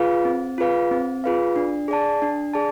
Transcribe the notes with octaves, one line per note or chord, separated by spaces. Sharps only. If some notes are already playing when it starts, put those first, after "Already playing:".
Already playing: F4 G#4 B4 F5
C4
F4 G#4 B4 F5
C4
F4 G#4 B4 F5
D4
G#4 D5 A5
D4
G#4 D5 A5